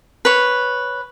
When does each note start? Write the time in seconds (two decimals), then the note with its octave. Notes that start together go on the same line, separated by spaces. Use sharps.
0.25 B4 C#5